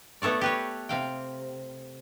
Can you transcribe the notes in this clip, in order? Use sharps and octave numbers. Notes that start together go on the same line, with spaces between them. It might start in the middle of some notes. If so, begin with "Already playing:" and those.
A3 B3 A4 C#5 D5
G4 B4 C#5
C3 F5 G5